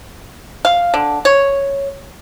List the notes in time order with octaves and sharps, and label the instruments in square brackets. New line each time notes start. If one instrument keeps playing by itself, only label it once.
[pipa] F5
D3
C#5